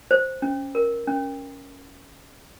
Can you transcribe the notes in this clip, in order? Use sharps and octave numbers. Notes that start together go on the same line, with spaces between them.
C5
C#4
A#4
C#4